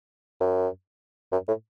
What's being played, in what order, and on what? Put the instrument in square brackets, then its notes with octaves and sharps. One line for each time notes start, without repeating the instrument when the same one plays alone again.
[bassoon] F#2
F#2
A2